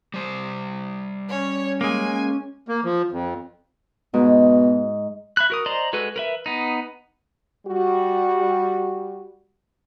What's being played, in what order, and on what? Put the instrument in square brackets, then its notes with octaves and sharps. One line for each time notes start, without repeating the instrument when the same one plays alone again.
[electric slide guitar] G3 C5
[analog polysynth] C#4 [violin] C#5
[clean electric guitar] G#3 A#3 [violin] G#5
[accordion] A#3
F3
F2
[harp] G#2 [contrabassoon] B2
[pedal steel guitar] E5 B5 F#6
F#4 A#4 D#6
C5 D5 D#5 A#5 C6
G#3 F#4 A4 B4
A#4 B4 E5
B3 D#4
[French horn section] G3 F#4